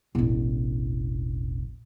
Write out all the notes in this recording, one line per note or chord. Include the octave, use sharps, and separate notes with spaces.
E1 A1